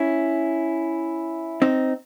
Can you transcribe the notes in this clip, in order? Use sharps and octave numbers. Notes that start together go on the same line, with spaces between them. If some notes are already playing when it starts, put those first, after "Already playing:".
Already playing: C#4 E4
C4 D#4